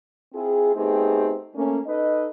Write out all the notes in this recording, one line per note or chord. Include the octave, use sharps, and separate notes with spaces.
C4 E4 F4 G#4
A3 B3 C4 D#4 G4 G#4
A3 A#3 C#4
D#4 A4 B4 D#5